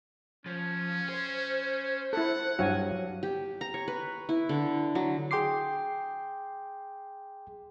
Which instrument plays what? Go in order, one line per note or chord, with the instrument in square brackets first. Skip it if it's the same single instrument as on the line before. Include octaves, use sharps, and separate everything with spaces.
[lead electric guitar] F3 [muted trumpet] C#4
[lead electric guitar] C5
[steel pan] E4 A4 [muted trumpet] F#5
[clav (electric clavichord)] G2 F#3 F5 [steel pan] F#4 G#5
[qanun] G4
A#5
C#5
B4
E4
D3
F#3
[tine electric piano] G#4 G5 C6 D6 C7